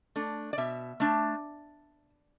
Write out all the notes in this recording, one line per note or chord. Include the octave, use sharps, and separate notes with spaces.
A3 D4
D5
B2 E5
A3 D4